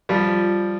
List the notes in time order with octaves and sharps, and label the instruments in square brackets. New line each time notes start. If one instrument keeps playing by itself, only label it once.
[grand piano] F3 G3